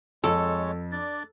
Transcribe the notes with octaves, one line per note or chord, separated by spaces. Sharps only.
F2 G#3 A4 C#5
D4 D5